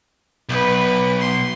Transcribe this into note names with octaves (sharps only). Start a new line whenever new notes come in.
B1 B4
C6